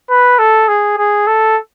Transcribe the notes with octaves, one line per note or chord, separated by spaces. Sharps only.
B4
A4
G#4
G#4
A4